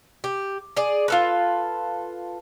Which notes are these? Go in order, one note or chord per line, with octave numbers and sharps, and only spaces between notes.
G4
G#4 D5
F4 A4 B4